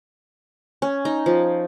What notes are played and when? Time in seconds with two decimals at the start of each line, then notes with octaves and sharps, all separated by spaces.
0.82 C#4
1.05 D#4
1.26 F3